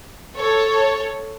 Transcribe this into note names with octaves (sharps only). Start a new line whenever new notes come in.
A4 C#5